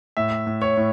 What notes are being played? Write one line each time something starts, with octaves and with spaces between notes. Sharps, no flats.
A2 E5
A2
C#5
A2